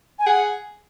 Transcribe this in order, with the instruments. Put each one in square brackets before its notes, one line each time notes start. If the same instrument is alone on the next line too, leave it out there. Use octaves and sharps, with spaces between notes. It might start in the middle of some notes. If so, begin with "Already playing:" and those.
[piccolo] G#5
[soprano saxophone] G#4 [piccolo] F#5